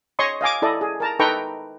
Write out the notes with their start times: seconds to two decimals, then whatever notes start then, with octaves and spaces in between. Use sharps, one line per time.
0.19 C#5 D#5 C6 C#6 D#6
0.41 D#5 F5 G#5 D6
0.62 E4 A4 D5 D#5
0.81 G#4
1.00 A#4 A5 A#5
1.19 D#4 A4 B4 G5 A#5 C#6